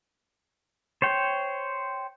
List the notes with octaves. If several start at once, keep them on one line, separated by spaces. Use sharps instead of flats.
C5 C#5 G5